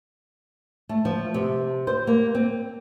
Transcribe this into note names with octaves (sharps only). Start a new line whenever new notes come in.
A3
F3
C3
C5
A#3
C4